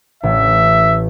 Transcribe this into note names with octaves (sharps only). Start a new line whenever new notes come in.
A1 E5